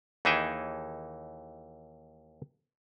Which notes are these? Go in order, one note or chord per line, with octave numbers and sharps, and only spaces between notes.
D#2 E3 D#4 G#4 E5 G5